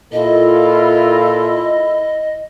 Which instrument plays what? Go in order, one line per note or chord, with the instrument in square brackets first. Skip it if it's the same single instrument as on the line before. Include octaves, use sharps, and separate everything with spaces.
[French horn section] A#2 F4 A4 [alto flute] E4 [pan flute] D#5